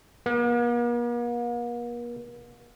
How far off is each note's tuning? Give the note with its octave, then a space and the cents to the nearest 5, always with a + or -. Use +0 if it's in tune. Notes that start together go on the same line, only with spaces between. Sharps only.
A#3 +45